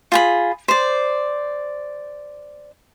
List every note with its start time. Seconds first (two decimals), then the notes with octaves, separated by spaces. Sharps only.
0.12 F4 G#4 B5
0.68 C5 D5